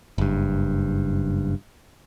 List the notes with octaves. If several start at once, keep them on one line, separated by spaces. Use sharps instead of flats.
F#1 G2